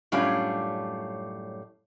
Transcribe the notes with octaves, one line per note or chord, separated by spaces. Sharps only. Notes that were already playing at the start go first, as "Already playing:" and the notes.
F#2 A2 G3 C#4 D4 F4